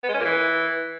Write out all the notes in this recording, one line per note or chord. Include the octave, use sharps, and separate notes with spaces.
B3
G#3
C#4
A#2
E3